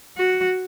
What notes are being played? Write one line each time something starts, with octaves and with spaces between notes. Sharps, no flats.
F#4